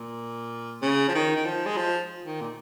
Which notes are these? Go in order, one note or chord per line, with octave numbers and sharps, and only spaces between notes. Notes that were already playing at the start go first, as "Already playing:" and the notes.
Already playing: A#2
C#3
F3
D#3
D#3
F3
G#3
F3
D#3
A#2